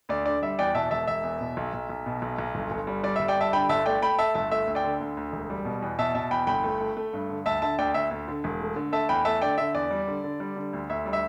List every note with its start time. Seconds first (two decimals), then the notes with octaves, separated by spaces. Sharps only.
0.09 D2 D5
0.26 D3 D5
0.43 G3 E5
0.59 E2 D5 G5
0.74 B2 E5 A5
0.91 E1 E5 A5
1.07 E1 E5
1.23 E2
1.41 B2
1.57 B1
1.74 B1
1.89 B1
2.06 B2
2.22 B1
2.38 B1
2.55 G1
2.71 G1
2.87 G3
3.03 G3 D5
3.16 E5
3.20 G1
3.28 D5 G5
3.36 G3 E5 A5
3.53 D3 G5 B5
3.69 G1 E5 A5
3.86 A3 D5 G5
4.02 A3 G5 B5
4.18 A3 E5 A5
4.35 G1 E5 A5
4.51 A3 E5
4.67 D2
4.75 D5 G5
4.84 D3
5.01 D2
5.17 D2
5.32 E1
5.50 G3
5.65 B2
5.82 E2
5.99 B2 E5 A5
6.14 B2 E5 A5
6.31 E2 G5 B5
6.47 G1 G5 B5
6.64 A3
6.80 A3
6.97 A3
7.13 G2
7.29 D3
7.46 D2 E5 A5
7.62 D3 E5 A5
7.78 D2 D5 G5
7.94 D2 E5
8.11 D2
8.28 D3
8.44 E1
8.61 A3
8.76 D3
8.92 A3 E5 A5
9.09 E2 G5 B5
9.25 A3 E5 A5
9.42 D3 D5 G5
9.58 D3 E5
9.75 E2 D5
9.91 G3
10.08 D3
10.24 D3
10.40 G3
10.56 D3
10.73 D2
10.89 D2 E5
11.06 G3
11.13 E5